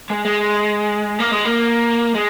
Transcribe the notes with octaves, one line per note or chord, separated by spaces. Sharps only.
G#3
G#3
A#3
G#3
A#3
G#3